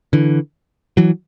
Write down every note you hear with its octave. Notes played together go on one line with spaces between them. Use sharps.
D3 E3
E3 F#3